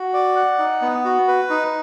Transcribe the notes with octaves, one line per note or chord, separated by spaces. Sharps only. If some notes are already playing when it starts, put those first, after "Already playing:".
Already playing: F#4
D5
F#5
D#4
B3
F#4
B4
D#4